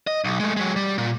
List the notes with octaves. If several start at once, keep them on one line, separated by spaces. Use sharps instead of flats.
D#5
B1
G#3 A3
F#3 G#3
G3
A#2